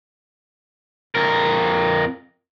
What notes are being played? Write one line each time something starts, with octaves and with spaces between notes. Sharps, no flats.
F2 A#4